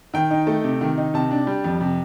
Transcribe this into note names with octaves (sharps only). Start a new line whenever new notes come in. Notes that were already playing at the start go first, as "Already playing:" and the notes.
D#3 G5
D#4
A3
C3
D#3
D#4
C3 A5
D4
G3
F2
C3